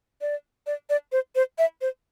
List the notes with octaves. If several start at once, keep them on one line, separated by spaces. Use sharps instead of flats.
D5
D5
D5
C5
C5
E5
C5